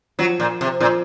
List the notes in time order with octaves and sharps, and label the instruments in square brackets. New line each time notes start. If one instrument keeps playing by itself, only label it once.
[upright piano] F3 [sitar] F#3
[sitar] A#2
C3
[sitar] A#2 [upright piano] F3